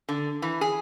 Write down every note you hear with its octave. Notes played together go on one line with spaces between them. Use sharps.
D3
E3
G#4